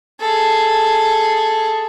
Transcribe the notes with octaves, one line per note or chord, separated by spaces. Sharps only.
G#4 A4